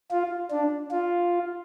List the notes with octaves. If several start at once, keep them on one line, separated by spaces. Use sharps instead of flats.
F4
D4
F4